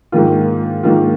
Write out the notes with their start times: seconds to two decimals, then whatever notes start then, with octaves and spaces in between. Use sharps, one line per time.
0.12 G#2 D#3 A#3 F4
0.83 G#2 D#3 A#3 F4